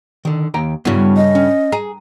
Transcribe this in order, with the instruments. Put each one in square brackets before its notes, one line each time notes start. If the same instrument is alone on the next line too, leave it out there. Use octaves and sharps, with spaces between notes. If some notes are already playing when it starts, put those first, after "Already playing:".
[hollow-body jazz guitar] D3 D#3
D#2 G5 A#5
[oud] G2 C#3 [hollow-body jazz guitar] B3 E4 F#4
[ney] D#5
[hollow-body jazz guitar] C#4
[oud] G#4 [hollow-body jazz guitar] A#5